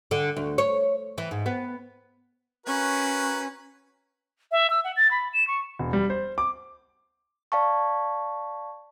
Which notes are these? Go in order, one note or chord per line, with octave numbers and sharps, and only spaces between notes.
D3
D2
C#5
E3
G#2
B3
C#4 F#4 A#4 B4
E5
E6
F#5
A6
B5
E7
C#6
E1
G3
C5
D6
D5 F5 A5 C#6